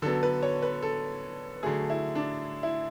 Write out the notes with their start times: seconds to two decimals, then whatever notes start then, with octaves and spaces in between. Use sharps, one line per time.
0.02 D3 F#3 B3 A4
0.23 B4
0.43 C#5
0.62 B4
0.82 A4
1.63 D3 F#3 A3 G#4
1.90 E4
2.15 D4
2.63 E4